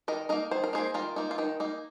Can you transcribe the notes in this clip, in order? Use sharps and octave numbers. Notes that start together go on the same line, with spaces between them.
D#3 A#4 D#5
A#3 D#4 A#4 D#5
D#3 C5
A#4
A#3 D#4 G#4 C5
D#3 F4 A#4
A#3 D#4
F4
D#3 D#4
A#3 D#4